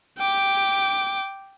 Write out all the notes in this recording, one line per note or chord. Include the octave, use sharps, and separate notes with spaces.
G5 D6